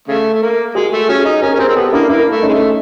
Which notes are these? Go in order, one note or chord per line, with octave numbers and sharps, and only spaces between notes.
C#3 A3
A3
A#3
G#3 F#4 G#4
A3
C#4 F#4 G#4
D#4
C#4 G#4 A#4
C#4
C4 G#4 A#4
C4
B3 G4 A4
A#3 D4 E4
A#3 D4 E4
A3
C#4 D#4
G#3
A3